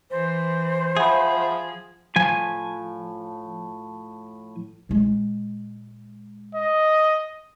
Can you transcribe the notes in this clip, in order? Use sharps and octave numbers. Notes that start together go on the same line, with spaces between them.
E3 C5
F3 G#4 E5 F#5 B5
A2 F3 G#5
A#2 G#3
D#5